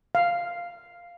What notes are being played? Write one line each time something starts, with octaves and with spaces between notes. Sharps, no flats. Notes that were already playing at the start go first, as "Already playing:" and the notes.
F5